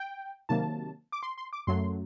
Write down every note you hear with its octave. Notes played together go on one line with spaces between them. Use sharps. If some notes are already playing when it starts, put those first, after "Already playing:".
Already playing: G5
C3 D#3 F#3 A#3 A5
D6
C6
C6
D6
F#2 F#3 A3 C6